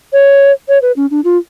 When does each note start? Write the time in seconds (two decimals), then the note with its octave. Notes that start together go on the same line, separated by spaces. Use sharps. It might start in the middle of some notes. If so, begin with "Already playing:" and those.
0.13 C#5
0.69 C#5
0.82 B4
0.96 C#4
1.11 D4
1.24 F4